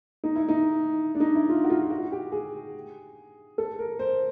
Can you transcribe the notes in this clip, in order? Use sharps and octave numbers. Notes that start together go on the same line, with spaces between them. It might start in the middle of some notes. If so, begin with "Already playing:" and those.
D#4
E4
D#4
D4
D#4
E4
F4
F#4
F4
F4
F#4
G4
G#4
A4
A#4
C5